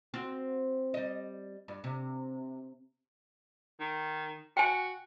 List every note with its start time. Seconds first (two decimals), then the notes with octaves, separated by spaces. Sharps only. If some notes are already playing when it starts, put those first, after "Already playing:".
0.14 C4 F#4
0.94 G3 D#5
1.68 G2
1.84 C3
3.80 D#3
4.57 F#4 G5 G#5